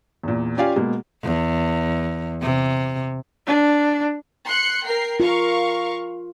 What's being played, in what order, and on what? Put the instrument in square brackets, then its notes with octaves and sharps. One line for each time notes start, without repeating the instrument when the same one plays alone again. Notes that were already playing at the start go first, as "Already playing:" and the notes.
[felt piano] E2 A#2
C#4 F4 G4 D5 F5 G#5
B2 G#3 A#3
[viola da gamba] E2
C3
[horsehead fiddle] D4
[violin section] C6 F#6 C#7
A#4 G5 C7
[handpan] F4 [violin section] A#4 F5 C#6